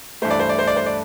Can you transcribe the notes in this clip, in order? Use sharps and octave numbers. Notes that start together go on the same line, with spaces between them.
G2 E3 A3 C5
D5
C5
D5
C5
D5
C5
D5